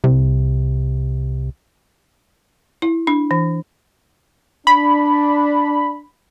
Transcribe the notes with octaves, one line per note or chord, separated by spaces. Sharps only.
C2 C3
E4
D4
E3
D4 B5